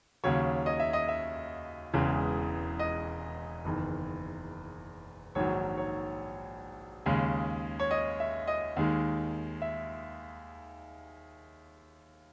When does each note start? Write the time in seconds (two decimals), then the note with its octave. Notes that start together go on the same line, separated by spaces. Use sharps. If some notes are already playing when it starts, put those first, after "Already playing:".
0.24 D#2 C#3 F#3 C#5
0.66 D#5
0.80 E5
0.93 D#5
1.09 E5
1.94 E1 E2 C#3 E3 G#3
2.79 D#5
3.65 F#1 E2 D#3
5.35 A#1 G#2 D#3 F#3 C#5
5.77 C#5
7.06 D#2 C#3 G#3
7.80 C#5
7.91 D#5
8.20 E5
8.47 D#5
8.77 D#2 D#3 G#3
9.62 E5